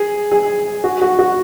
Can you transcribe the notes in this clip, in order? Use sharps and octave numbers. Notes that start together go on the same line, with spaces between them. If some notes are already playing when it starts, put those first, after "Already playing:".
Already playing: G#4
G#4
F#4
F#4
F#4